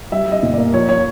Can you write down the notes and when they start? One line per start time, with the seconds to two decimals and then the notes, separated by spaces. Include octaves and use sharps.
0.12 G3 E5
0.28 G3 D#5
0.43 A#2
0.54 A#3 D5
0.74 F3 C#5
0.89 F3 C#5